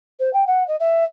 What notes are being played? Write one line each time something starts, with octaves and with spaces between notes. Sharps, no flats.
C5
G5
F#5
D#5
E5